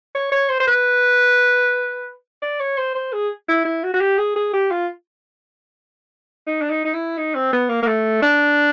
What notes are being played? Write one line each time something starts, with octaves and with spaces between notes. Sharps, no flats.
C#5
C#5
C5
C5
B4
D5
C#5
C5
C5
G#4
E4
E4
F#4
F#4
G4
G#4
G#4
G4
F4
D#4
D4
D#4
D#4
E4
D#4
C4
B3
A#3
A#3
A3
D4